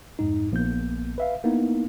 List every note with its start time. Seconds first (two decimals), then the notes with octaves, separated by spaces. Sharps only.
0.19 F2 G#2 D#4
0.52 A#1 A#3 B3 G6
1.18 B4 E5 F5
1.44 A#3 B3 D#4 E4